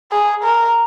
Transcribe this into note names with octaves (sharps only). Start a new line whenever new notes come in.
G#4
A#4